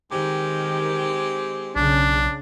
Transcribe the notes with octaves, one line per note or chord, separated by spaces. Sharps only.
D#3 G#3 C4 G4
B1 C#3 D4